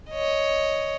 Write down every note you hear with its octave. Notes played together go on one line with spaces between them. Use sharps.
C#5 D#5